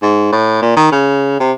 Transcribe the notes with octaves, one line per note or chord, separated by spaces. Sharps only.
G#2
A2
A#2
D#3
C#3
C3